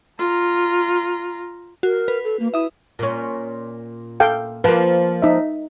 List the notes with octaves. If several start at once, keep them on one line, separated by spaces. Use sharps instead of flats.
F4 A#5
F#4 A#4
B4
A4
A#3
E4 E5 D#6
A#2 C#4
A4 F5 G5
F3 A#3 B4
D#4 E5